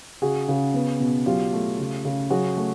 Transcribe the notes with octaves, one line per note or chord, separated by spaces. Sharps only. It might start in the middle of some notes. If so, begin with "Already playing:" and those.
C#3 F#4 G#4
C#3
B3
B2
F#3 F4 G4
A3
C#3
C#3
F#3 F#4 G#4
A3